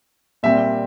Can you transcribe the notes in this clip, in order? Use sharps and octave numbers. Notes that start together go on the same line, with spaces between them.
A#2 G3 C4 E5